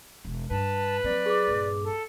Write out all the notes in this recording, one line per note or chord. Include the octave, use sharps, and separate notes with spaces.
E1
G2 B4 A5
F#3 C4 D5
G#4 D6
A#1 G2
A4